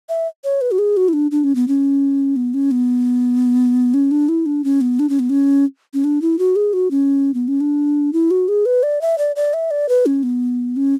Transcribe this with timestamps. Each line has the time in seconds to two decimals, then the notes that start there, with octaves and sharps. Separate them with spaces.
0.09 E5
0.44 C#5
0.61 B4
0.71 F#4
0.79 G#4
0.97 F#4
1.09 E4
1.13 D4
1.31 D4
1.44 C#4
1.55 B3
1.68 C#4
2.36 B3
2.54 C#4
2.71 B3
3.94 C#4
4.11 D4
4.29 E4
4.46 D4
4.64 C#4
4.81 B3
4.99 D4
5.09 C#4
5.19 B3
5.30 C#4
5.94 C#4
6.04 D4
6.22 E4
6.39 F#4
6.56 G#4
6.73 F#4
6.91 C#4
7.34 B3
7.48 C#4
7.61 D4
8.13 E4
8.31 F#4
8.48 G#4
8.66 B4
8.83 D5
9.01 E5
9.18 D5
9.36 D5
9.54 E5
9.71 D5
9.89 B4
10.06 C#4
10.23 B3
10.76 C#4